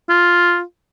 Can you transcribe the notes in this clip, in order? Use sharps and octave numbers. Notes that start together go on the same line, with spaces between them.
F4